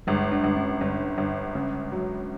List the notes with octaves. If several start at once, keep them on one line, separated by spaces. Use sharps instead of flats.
G1 G#3
D4
G1
C#4
G1 D4
G1
C#3
F#3